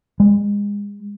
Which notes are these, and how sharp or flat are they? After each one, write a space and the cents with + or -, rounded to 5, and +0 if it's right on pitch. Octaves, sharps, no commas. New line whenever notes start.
G#3 -30